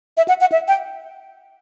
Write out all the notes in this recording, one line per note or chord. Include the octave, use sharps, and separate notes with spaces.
E5
F#5
F#5
E5
G5